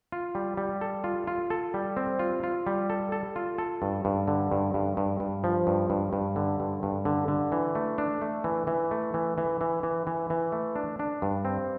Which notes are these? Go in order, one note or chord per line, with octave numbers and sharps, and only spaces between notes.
F4
G3
G3
A4
F4
F4
A4
G3
C4
F4
F4
G3
A4
A4
F4
A4
G2
G2
D3
G2
G2
G2
G2
F3
G2
G2
G2
D3
G2
G2
D3
D3
E3
A3
D4
A3
E3
E3
A3
E3
E3
E3
E3
E3
E3
A3
D4
D4
G2
C4